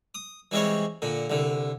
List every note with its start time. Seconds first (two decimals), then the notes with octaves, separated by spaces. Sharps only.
0.15 D#6
0.51 E3 G3 G#3 C4 C#5
1.02 A#2 D3
1.30 C2 D3